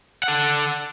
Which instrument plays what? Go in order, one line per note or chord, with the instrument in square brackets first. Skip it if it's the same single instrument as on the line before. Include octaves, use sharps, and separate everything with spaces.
[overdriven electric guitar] A4 F#5